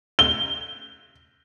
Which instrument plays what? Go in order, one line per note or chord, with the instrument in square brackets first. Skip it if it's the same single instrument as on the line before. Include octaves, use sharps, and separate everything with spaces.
[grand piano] G7